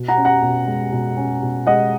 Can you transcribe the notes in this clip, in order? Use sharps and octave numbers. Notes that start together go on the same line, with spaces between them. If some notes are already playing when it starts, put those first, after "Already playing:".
Already playing: B2
F#5 A#5
C#4
F#5 A#5
B2
G#3
B2
C#4
B2
G#3 D#5 F#5